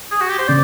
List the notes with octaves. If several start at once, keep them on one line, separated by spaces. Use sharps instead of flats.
G#4
F#4
G4
C5
C#3 D5